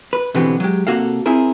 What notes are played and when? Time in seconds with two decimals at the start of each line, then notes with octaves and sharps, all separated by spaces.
0.13 B4
0.34 B2 D3 E3 B3 C4 G4
0.60 F#3 G#3 G4
0.87 C3 E3 A#3 F#4 A4 F5
1.26 C4 E4 G#4 A#4